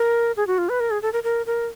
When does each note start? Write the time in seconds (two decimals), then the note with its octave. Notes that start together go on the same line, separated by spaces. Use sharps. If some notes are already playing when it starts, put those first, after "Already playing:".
Already playing: A#4
0.37 G#4
0.47 F#4
0.58 F4
0.69 B4
0.80 A#4
0.91 G#4
1.02 A4
1.13 A#4
1.24 A#4
1.46 A#4